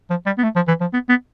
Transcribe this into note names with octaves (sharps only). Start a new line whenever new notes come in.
F3
G3
B3
A3
F3
E3
F3
B3
B3